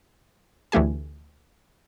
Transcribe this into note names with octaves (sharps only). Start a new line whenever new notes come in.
D2 E3 A3 G4 G#5